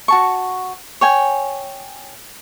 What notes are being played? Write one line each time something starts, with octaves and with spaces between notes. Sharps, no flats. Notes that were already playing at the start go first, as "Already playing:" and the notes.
F#4 A5 C#6
C#5 G5 G#5